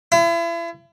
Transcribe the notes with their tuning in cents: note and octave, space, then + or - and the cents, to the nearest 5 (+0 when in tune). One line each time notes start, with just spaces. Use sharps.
E4 +40